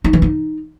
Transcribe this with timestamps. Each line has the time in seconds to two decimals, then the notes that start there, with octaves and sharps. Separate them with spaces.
0.04 D#4
0.13 E3
0.22 D#4